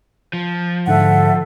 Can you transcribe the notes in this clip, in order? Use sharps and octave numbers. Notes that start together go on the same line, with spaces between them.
F3
G#2 D3 A4 E5 F#5